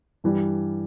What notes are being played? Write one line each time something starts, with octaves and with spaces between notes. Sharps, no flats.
G2 E3 G3